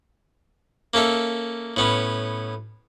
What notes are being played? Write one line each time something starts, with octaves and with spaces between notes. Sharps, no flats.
A#3 C#4 A4 E5
A2 B3 C#4